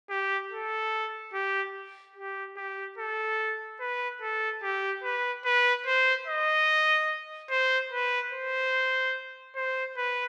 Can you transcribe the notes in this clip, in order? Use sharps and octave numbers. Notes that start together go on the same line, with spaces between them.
G4
A4
G4
G4
G4
A4
B4
A4
G4
B4
B4
C5
D#5
C5
B4
C5
C5
B4